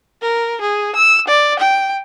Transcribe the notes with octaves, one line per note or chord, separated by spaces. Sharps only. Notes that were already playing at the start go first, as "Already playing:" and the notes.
A#4
G#4
E6
D5
G5